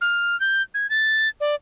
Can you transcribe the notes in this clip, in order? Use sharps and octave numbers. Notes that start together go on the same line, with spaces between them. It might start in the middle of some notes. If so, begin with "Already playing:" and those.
F6
G6
G#6
A6
D5